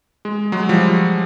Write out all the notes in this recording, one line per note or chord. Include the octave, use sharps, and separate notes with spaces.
G#3
F#3 G#3
F3 G3